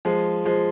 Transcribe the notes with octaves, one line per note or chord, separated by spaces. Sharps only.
F3 G#3
F3 G#3